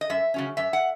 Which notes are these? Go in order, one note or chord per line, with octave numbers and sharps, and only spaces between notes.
D#5
F#2 E5
C#3 F#3 C#4
F#2 E5
F#5